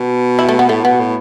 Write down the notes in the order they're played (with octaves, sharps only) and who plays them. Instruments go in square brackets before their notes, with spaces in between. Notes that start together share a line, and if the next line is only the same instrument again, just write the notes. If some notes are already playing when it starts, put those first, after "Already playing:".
Already playing: [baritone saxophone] B2
[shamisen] E4
A3
B3
[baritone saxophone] A2 [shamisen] A3
[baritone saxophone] B2 [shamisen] B3
[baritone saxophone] A2